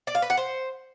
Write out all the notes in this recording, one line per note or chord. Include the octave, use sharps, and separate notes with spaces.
D5
F5
B4
F#5
C5